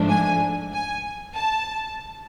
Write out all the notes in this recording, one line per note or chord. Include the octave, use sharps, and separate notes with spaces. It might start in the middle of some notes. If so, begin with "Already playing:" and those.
Already playing: G#2 F3 A3 D4
G#5
G#5
A5